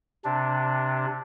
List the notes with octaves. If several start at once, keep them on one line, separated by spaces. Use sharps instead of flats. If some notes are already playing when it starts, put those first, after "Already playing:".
C3 D4